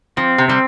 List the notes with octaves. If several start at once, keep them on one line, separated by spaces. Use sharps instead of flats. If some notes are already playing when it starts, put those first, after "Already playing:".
F3 C4
C3
G3 C4